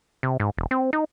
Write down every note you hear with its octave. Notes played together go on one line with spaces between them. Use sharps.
C3
G#2
E1
C4
D#4